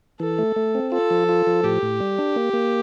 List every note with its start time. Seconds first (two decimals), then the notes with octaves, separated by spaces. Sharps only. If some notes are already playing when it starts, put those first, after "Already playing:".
0.20 E3 A4
0.39 A3
0.56 A3
0.75 C4
0.92 F4 A4
1.10 F3
1.29 F4
1.47 F3
1.64 A2 G4
1.82 A2
2.00 G3
2.18 D4
2.36 A#3
2.53 A#3